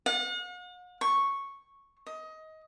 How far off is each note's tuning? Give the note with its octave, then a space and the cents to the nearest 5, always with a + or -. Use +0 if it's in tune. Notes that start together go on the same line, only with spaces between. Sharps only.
F#5 -45
C#6 -5
D#5 +20